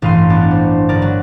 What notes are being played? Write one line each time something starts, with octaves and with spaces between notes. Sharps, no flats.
A1 G2 F5 C6 D#7
B3 D4 D5
G3 C5
G1 A#4 D5
F#3